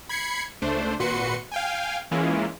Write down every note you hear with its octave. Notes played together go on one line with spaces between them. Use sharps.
B5 G#6 C7 C#7
C#2 A3 D4 C5
G#1 A#2 F#4 B4 C6 C#7
F5 G5 G#5
E3 G#3 A#3 C#4 E4 F4